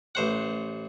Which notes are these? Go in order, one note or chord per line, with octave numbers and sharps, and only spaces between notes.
A1 C5 F#5